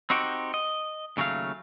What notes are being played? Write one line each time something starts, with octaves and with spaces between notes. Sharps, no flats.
C4 D#4 F#4 G4
D#5
D#2 C#3 F#3 A3 F5